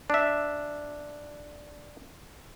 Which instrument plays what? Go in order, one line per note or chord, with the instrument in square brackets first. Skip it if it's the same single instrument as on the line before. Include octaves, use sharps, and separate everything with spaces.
[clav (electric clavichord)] D4 E5